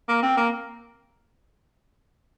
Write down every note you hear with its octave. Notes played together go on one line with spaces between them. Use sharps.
A#3
C4
A#3